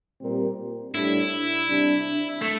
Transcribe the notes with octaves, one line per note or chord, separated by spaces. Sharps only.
A#2 G3 C4 G4 A#4
A2 G3 D4 E4
C3 G3 D4
A3